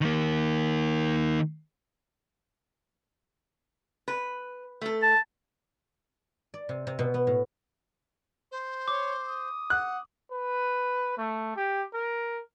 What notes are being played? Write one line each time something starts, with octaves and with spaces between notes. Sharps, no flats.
D#3 A#3
B4
A3 A4
A5
D5
C3
C3
B2
B3
A2
C5
C#5 D6
D#6
F#5 F#6
B4
A3
G4
A#4